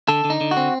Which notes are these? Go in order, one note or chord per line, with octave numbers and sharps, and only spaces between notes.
D3 A4
D3
D#4
D3
F#4
C4